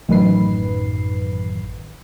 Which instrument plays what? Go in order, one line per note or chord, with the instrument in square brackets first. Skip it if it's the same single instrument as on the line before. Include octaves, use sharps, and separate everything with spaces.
[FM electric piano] A1 F#2 D#3 B4 C7